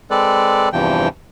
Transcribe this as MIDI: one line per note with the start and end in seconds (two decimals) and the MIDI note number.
0.11 0.69 56
0.11 0.69 60
0.11 0.69 69
0.11 0.69 71
0.11 0.69 74
0.73 1.08 40
0.73 1.08 43
0.73 1.08 48
0.73 1.08 52
0.73 1.08 53
0.73 1.08 79